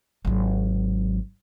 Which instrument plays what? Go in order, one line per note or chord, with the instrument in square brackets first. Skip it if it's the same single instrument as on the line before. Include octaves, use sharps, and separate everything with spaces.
[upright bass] G#1 F#3